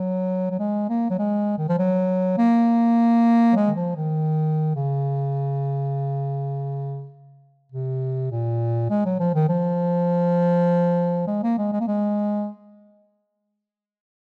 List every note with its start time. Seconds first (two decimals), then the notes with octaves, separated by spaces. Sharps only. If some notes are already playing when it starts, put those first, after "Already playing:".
Already playing: F#3
0.51 F#3
0.59 G#3
0.89 A#3
1.10 F#3
1.19 G#3
1.58 D#3
1.69 F3
1.78 F#3
2.38 A#3
3.53 F#3
3.56 G#3
3.68 D#3
3.76 F3
3.97 D#3
4.76 C#3
7.72 C3
8.32 A#2
8.90 G#3
9.06 F#3
9.20 F3
9.35 D#3
9.49 F3
11.27 G#3
11.43 A#3
11.58 G#3
11.73 G#3
11.80 A#3
11.88 G#3